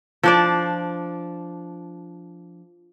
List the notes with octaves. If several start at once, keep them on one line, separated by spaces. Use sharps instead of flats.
F3 D4 D5